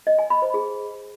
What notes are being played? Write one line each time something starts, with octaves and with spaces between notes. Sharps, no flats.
D#5
G#5
B5
C5
G#4